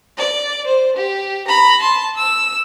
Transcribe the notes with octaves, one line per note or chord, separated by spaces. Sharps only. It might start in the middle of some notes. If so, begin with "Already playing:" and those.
D5
C5
G4
A#5 B5
A5 C6
E6